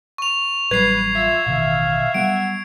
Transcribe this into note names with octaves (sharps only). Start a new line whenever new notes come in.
C#6 F7
A1 F#3 G3 B4 G#6 C7
F4 E5
A1 B2 D#3 F5
F#3 G3 B3 F#5 D7